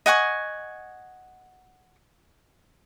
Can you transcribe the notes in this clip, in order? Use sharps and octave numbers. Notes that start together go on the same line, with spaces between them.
D#5 F#5 G#5 C#6